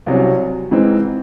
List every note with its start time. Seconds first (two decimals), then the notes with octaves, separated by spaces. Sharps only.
0.06 C2 C3 F#3 C#4
0.71 G#2 E3 C4 D#4